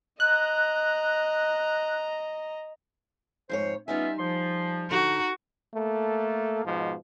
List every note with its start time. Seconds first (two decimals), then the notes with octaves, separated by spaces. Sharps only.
0.20 D#5 A#5 F#6
3.49 F2 G#2 C5 C#5
3.88 G3 B3 C#4 D#4 F4 E5 G#5
4.19 F3 C6
4.91 D3 D#4 F#4
5.74 A3 A#3 A4
6.66 G#2 B2 F3